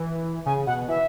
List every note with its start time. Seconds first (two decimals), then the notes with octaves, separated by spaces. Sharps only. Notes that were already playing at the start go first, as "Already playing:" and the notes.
Already playing: E3
0.46 C#3 G#5
0.67 B2 F#5
0.88 E3 E5